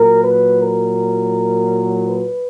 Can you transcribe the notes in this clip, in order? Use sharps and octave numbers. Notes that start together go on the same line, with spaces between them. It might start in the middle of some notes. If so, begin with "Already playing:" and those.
Already playing: A#2 F#3 A#4
B4
A#4
B4